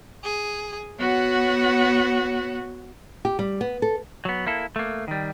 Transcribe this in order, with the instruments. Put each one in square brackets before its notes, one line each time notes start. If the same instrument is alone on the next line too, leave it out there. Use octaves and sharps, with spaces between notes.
[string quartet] G#4
B3 F#4 C#5 F#5
[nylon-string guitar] G4
G3
B3
A4
[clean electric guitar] F#3 B3
A#3 E4 A4
A3 A#3
D#3 G3